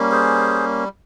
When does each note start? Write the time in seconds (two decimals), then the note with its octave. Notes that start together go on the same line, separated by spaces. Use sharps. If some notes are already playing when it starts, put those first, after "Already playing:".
Already playing: G3 A#3 C#4
0.12 G#4 C5